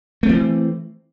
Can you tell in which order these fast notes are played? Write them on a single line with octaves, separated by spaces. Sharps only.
A3 C4 E3